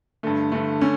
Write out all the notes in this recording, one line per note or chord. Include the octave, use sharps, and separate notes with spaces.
G2 D3 A3
G2 D3 A3
D3 A3 C#4